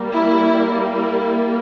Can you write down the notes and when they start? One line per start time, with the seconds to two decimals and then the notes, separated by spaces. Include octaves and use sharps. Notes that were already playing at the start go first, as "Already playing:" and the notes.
Already playing: G3 A#3
0.12 E4
0.94 E4